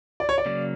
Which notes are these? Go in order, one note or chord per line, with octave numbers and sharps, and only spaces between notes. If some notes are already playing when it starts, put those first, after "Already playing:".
D5
C#5
D5
C#3 F#3 A#3